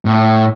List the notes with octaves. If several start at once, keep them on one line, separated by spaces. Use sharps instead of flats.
A2